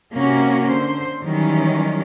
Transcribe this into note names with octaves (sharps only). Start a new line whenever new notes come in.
C3 A#3 C#4 F#4
D3 C5
D#3 E3 F#3 G3 C#4